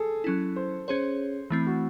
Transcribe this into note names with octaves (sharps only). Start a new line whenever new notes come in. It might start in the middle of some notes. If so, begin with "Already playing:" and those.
Already playing: G#4 A4
F#3 C#4 E4
C5
C#4 G#4 C5 C#5
E3 A3 C4 E4
F#4